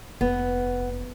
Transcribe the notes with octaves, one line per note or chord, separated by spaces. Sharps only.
F1 B3